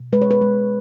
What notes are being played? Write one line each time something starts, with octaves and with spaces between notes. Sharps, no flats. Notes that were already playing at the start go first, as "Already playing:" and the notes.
Already playing: B2
G#3 B4
C#5
B4
G#3